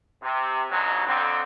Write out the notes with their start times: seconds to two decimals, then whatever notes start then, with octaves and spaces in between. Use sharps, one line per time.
0.23 C3
0.71 D2 G#2 B2 F#3
1.07 F2 D3 C4